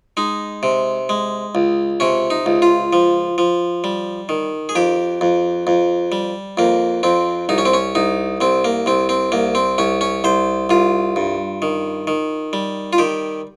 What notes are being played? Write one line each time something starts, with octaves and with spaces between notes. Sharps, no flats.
G#3 D#4
C3
G#3
C#2
C3 C#4
D#4
C#2
F4
F3
F3
G3
D#3
G#4
F2 G4
F2
F2
G3
F2 A#3
F2 C4
C2 D#4
C#4
C4
C#4
C2 D#4
C2 C4
A#3
C2 C4
C4
C2 A#3
C4
C2 C#4
C#4
C2 C5
C2 F4
G2
D#3
D#3
G3
F4
D#3 G4